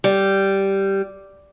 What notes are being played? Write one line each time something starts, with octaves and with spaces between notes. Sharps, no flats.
G3